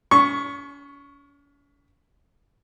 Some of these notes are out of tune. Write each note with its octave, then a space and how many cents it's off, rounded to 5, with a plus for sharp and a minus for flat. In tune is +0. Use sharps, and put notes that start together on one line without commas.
C#4 +40 C#6 +0